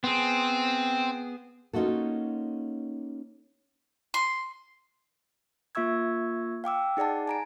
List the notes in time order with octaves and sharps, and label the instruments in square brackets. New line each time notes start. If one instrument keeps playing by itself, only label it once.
[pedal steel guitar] B3 G#4 [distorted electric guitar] C4
[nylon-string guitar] A#3 C#4 D#4 F4 F#4 A4
[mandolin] C6
[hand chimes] A#3 F4 E5 C#6 E6 G#6
F5 G5 D6 E6
D#4 G#4 D5 F#5 A5
G#5 A#5 D7